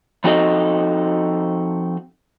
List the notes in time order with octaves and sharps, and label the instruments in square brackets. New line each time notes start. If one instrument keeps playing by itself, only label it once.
[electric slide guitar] F3 C4 D#4 F#4 A4 D#5